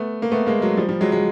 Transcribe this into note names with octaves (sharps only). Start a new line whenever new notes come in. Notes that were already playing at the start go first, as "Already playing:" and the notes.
Already playing: A3 B3
A#3
A3 B3
G#3 A#3
F#3 G#3
F3 G3
F3 G3
F#3 G#3
F#3 G#3